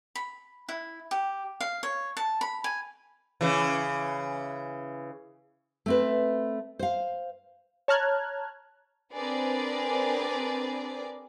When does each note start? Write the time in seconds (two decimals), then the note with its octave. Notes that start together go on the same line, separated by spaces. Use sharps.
0.15 B5
0.69 E4
1.11 G4
1.61 F5
1.83 C#5
2.17 A5
2.41 B5
2.64 G#5
3.41 C#3 E3
5.86 A3 C4 B4
6.79 C5 F5
7.88 C#5 A5 A#5 F6 F#6 G#6
9.13 C4 D4 G#4 A#4 B4 D5